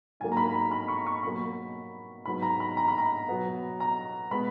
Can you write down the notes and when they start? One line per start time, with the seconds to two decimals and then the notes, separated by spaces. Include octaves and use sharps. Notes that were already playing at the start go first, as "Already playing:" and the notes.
0.20 G#2 F#3 A#3 G#5
0.32 A#5
0.37 B5
0.54 A#5
0.71 B5
0.88 C#6
1.06 C#6
1.23 B2 F#3 A#3 B5
2.25 G#2 F#3 B3 B5
2.42 A#5
2.60 B5
2.77 A#5
2.88 B5
2.98 A#5
3.28 B2 F#3 B3
3.80 A#5
4.31 B2 G#3 B3 B5